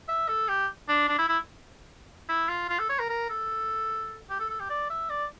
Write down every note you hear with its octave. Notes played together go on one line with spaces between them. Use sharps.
E5
A4
G4
D4
D4
E4
E4
E4
F4
F4
A4
C#5
A#4
A#4
A4
G4
A4
A4
G4
D5
E5
D5